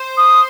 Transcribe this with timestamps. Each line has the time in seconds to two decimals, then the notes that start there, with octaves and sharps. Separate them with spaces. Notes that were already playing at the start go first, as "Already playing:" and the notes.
Already playing: C5
0.17 D#6